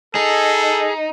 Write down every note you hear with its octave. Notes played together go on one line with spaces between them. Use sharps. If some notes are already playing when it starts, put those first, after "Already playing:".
D#4 G#4 A4